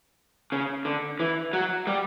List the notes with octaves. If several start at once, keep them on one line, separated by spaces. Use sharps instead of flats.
C#3
D3
E3
F#3
G3